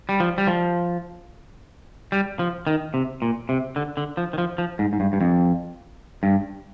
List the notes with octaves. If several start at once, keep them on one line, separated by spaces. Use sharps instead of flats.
G3
F3
G3
F3
G3
F3
D#3
C3
A#2
C3
D3
D3
F3
D#3
F3
F3
G#2
G#2
G2
G2
F2
G2